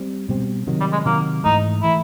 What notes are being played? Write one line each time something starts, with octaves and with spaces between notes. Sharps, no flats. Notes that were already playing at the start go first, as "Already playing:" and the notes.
Already playing: G3 C4
B2 G3 C4
C3 D#3 F#3
G3
G#3
C3 D#3 F#3 A#3
G#2 E3 A3 D#4
E3 A3 E4